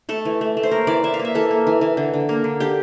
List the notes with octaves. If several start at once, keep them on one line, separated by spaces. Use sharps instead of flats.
A3 A4
E3
A3
A3
C5
A#3 A#4
E3 D5
E3 E5
F5
A#3
E5
E3 A4
A#3
E3
E3
D3
D3
A#3
D3
D3 G4